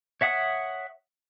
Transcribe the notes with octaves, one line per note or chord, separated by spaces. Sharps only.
C#5 E5 F#5 D#6